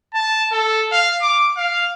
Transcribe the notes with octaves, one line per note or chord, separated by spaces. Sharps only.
A5
A4
F5
D6
F5